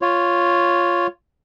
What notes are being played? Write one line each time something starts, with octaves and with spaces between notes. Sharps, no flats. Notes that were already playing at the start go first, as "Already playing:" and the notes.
F4 C#5